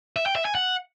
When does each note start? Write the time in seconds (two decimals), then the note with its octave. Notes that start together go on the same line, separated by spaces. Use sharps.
0.16 E5
0.26 G5
0.36 E5
0.45 G#5
0.55 F#5